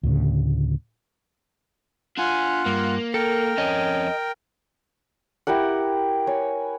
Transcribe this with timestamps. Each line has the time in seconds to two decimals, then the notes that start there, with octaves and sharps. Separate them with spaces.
0.03 D2 A2 C#3
2.18 D4 F4 F#5 G#5
2.66 G2 A#3
3.14 A4 A#4 G5
3.58 F2 C#4 D#5
5.47 E4 G4 A#4 F#5
6.27 C#5 G#5